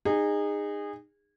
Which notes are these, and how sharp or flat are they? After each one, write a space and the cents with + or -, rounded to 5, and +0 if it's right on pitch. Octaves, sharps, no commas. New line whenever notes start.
D#4 -25 G#4 -25